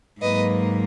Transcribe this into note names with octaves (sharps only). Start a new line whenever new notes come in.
G#2 F#3 A#3 B4 D#5